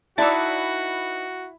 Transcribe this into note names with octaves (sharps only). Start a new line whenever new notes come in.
D#4 E4 F#4 B4 D5 A5 E6